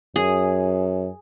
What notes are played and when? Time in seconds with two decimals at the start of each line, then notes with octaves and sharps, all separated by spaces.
0.16 F#2 G#4